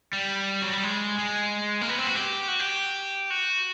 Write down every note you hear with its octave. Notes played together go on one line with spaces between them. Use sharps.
G3
F#3
G3
G#3
G#3
A#3
B3
C4
F#4
G4
F#4
G4
F#4